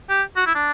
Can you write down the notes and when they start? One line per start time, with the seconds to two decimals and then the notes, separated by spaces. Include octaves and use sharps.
0.10 G4
0.37 F#4
0.46 E4
0.55 D4